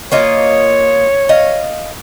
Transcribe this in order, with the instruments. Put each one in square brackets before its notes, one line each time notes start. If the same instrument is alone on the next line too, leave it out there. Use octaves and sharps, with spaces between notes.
[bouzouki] A#3 F4 D#5 [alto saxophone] C#5
[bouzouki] D#5 F5